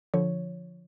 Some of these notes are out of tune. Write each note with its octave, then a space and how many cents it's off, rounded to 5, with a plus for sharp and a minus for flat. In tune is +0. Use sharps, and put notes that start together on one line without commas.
D3 -5 F3 +0 C#5 +0